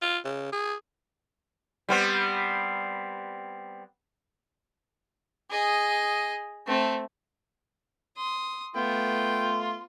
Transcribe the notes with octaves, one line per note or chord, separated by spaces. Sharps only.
F4
C#3
G#4
G3 B3 C4
G#4 D#5
A3 C4
C6 D#6
A3 B3 F4 G5 C6